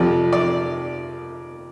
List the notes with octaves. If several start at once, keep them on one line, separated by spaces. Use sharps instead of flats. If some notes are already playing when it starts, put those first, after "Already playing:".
Already playing: F2 C3 F3 D5
D5